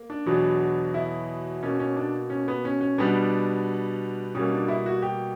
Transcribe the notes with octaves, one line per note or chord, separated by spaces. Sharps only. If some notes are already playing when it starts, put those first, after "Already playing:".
Already playing: A#3
D4
E2 B2 F#3 B3
E4
B2 A#3 C#4
C#4
D4
C#4
B3
C#4
C#4
B2 G3 B3 D4
B2 G3 A#3 C#4
D4
E4
F#4
G4